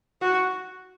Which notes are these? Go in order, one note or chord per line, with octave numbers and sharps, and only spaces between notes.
F#4